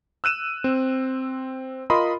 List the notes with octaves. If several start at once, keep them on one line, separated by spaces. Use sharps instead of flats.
E6 F#6 D#7 E7
C4
F4 A#4 D#5 B5 C6 D#6